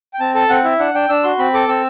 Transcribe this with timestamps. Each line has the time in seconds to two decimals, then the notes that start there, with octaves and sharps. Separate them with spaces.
0.14 G5
0.20 C4 A5
0.35 A4 A5
0.50 C4 F#5
0.64 E4 E5
0.79 D4 F#5
0.94 D4 G5
1.09 D4 E6
1.24 F#4 C6
1.39 C4 B5
1.54 A4 D6
1.68 C4 E6